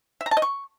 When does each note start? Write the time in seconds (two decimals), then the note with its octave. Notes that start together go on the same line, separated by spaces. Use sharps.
0.21 E5
0.26 A#5
0.31 A5
0.37 D#5
0.42 C#6